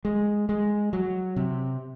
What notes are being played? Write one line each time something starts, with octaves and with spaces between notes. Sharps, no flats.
G#3
G#3
F#3
C3